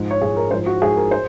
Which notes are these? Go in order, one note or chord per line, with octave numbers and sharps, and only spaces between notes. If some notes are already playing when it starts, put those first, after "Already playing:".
Already playing: G#2 F3
C#5
G#2 F3 G#4
A#4
G#2 F3 C5
F#4
G#2 F3 G#4
A#4
C5